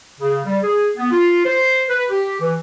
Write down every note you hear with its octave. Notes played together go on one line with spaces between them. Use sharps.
C#3
G3
G#4
B3
F4
C5
B4
G4
E3